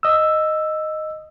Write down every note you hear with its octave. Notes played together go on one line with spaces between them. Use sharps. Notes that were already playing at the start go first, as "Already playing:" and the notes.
D#5 E6